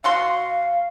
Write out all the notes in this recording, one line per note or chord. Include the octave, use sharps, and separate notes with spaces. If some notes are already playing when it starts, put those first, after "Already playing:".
B2 F#4 F5 C6